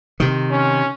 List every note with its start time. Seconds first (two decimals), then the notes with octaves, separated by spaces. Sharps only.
0.20 C3 D#3
0.51 C#4